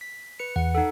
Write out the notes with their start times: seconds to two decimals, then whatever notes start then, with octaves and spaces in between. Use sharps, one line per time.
0.01 B6
0.39 B4 C#7
0.56 E2 F#5
0.75 D#4 A4 F#5